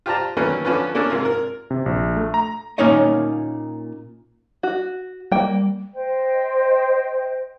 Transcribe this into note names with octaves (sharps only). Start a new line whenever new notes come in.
F4 G4 C5 A5 A#5
D#3 F#3 A3 A#3 C#4 B4
D3 F3 C#4 F4 B4
A#3 C#4 D4 A4
G#2 C3 F4 A#4
A#4
C3
A#1
A3
A#5
A#2 A#3 C#4 D#4 C#5 D#5
F#4
G3 A#3 G5
C5 D#5 G5